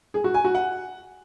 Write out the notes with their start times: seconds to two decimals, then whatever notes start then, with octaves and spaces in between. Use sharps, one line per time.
0.14 G#4
0.24 F#4
0.34 G#5
0.44 F#4
0.55 F#5